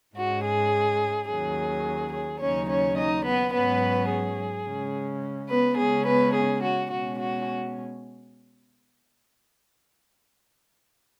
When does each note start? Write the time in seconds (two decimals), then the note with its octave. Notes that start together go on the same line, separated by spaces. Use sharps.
0.16 G#2 G#3 C#4 F#4
0.45 G#4
1.29 D#2 D#3 F#3 C#4 G#4
2.13 G#4
2.41 D#2 C#3 F#3 C#4 D#4 C#5
2.69 C#4 C#5
2.97 D#4 D#5
3.25 B3 B4
3.53 G#2 F#3 B3 C#4 B4
4.10 G#4
4.66 C#3 G#3 C#4
5.50 B3 B4
5.78 C#3 G#3 C#4 G#4
6.07 B3 B4
6.35 G#4
6.63 F#4
6.90 B2 G#3 C#4 F#4
7.19 F#4